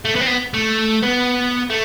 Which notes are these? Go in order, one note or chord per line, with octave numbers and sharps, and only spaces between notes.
A3
B3
C4
B3
A3
B3
A3